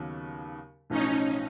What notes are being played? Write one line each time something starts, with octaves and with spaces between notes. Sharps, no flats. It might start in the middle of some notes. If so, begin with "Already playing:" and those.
Already playing: D#2 C#3 F#3 B3
B1 A2 F3 C#4 D#4